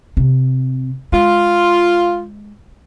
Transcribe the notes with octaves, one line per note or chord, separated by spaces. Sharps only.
C3
G#3 F4